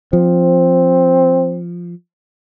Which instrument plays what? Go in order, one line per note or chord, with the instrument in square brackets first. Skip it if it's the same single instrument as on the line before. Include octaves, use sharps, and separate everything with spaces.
[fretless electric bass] F3 [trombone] C4